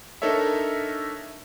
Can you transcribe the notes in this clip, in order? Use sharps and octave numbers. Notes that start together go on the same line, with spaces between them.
D4 D#4 A4 A#4 C#5 E5